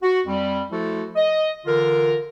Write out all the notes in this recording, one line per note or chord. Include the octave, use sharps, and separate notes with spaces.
F#4
F2 G3
F3 A3 E4 F#4 A4
D#5
D3 E3 F4 A#4